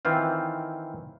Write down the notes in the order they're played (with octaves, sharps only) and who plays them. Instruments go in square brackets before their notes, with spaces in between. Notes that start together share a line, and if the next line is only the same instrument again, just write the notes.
[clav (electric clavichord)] D#3 E3 C4 F4